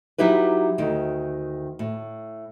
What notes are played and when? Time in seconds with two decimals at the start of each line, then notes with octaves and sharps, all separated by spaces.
0.18 F#3 D#4 E4 G4 B4
0.78 D2 D#3
1.79 A2